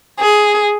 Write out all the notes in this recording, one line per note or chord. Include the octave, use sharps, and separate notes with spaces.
G#4